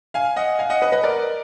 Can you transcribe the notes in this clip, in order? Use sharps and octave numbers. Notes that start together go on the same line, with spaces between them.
F5 G#5
D#5 F#5
F5 G#5
D#5 F#5
B4 D#5
B4 D#5
A#4 D5